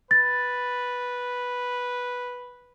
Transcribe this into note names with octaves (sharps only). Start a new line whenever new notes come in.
B4 A6